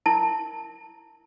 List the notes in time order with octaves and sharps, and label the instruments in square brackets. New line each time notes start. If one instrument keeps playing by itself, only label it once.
[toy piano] E4 A#4 A5